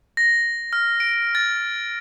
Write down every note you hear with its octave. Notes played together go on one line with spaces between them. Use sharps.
A#6
F6
D7
A6